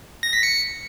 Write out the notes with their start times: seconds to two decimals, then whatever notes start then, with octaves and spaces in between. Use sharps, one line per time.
0.23 A#6
0.33 B6
0.43 C#7